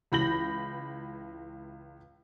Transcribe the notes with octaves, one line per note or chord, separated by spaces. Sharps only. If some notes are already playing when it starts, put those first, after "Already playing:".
C#2 E3 B5 G6 A#6 F#7